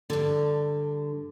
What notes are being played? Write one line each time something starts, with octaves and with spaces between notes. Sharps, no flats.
G2 D3